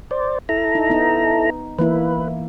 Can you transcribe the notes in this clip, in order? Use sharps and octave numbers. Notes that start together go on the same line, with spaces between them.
C5 D5
E4 A4 A#5
D#4
B3 D#4
E3 A#3 E4 B4